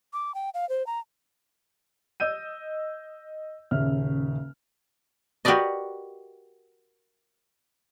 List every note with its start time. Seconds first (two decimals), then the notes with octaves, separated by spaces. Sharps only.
0.13 D6
0.35 G5
0.54 F5
0.69 C5
0.87 A#5
2.20 D#5 E6 G6 D#7
3.71 D#1 C#3 E5 F6
5.45 F#4 G4 A#4 B4 D5 D#5